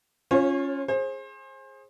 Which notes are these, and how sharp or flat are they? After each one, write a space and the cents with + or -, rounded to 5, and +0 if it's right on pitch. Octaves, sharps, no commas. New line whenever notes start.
C#4 +0 F4 +0 C#5 -35
G#4 +0 C5 +30